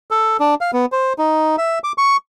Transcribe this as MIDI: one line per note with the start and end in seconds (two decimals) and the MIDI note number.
0.11 0.37 69
0.40 0.55 62
0.61 0.71 77
0.73 0.86 59
0.92 1.13 72
1.18 1.56 63
1.58 1.79 76
1.84 1.92 86
1.98 2.17 85